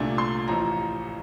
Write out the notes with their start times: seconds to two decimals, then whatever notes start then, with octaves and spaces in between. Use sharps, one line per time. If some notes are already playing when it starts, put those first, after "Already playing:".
Already playing: C2 A#2 A3 D4
0.18 C6
0.48 A1 A2 F3 A#5